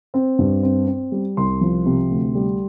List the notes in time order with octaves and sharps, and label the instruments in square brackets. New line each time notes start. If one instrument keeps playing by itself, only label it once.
[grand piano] C4
G2
C4
C4
G3
C2 C6
F3
C3
D2
G3